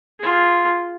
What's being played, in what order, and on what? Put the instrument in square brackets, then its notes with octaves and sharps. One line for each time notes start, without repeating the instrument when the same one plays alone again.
[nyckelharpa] F4 G#4